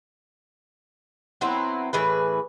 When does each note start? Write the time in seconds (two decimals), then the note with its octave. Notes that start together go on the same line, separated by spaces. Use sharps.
1.41 F#3 B3 C4 E4
1.93 A2 E3 G#4 B4